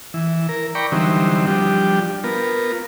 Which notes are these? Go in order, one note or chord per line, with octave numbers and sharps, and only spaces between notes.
E3
A#4
D5 G5 A#5 B5 C#6
D3 E3 F#3 G3 C4 D#4
F3 G3 D4 G4
B3 F4 A#4